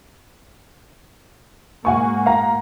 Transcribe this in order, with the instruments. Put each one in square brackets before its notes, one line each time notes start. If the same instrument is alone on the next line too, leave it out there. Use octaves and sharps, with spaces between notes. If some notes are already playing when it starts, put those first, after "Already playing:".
[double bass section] G#2 A#3 [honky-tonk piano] F#5 G#5 C#6
[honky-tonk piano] F5 F#5 A#5